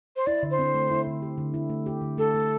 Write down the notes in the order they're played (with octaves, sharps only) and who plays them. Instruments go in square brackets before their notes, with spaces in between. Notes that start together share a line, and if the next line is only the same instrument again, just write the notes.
[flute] C5
[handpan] E4 [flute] D5
[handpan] D3
[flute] C5
[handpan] C4
A3
E4
D3
G4
D3
E4
A3
G4
D3
[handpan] A3 [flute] A4
[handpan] A3